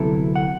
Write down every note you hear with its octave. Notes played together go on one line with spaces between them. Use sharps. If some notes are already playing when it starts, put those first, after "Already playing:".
Already playing: D2 C3 F#3 B3 E4 A4
F#5